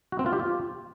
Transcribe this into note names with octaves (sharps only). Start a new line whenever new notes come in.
F#4
C4
F4
G4
F4